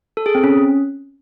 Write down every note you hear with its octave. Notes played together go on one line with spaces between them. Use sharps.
A4
G#4
C4
C#4